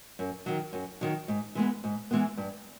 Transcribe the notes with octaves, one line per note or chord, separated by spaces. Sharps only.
F#2
D#3 F#3
F#2
D#3 F#3
G#2
E3 G#3 B3
G#2
E3 G#3 B3
G2